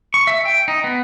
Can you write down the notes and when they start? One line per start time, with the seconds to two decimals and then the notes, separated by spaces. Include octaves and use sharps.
0.14 C#6
0.27 E5
0.45 G5
0.68 D#4
0.84 B3